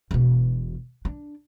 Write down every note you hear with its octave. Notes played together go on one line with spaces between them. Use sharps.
E1 B2
D4